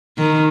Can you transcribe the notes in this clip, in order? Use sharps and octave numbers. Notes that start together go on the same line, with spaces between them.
D#3